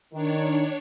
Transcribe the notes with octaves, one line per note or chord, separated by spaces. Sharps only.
D#3 D4 C#5